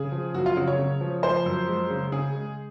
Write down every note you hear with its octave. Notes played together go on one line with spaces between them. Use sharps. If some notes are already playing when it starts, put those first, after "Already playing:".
Already playing: C#3 G#4
F3
F#2 F#4
F4
C#3 F#4
C#5
C#3
F3
F3 C5
F#2
G#3
C#3
C#3 G#4
G#3